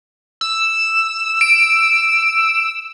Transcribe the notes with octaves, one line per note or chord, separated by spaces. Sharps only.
E6
D7